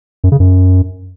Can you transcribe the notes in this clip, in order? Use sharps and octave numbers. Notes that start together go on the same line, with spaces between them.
F#2
C#3
F#2